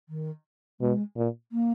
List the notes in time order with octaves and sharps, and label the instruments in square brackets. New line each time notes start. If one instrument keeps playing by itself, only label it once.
[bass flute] D#3
[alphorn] B2 [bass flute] G#3
[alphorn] A#2
[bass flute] A#3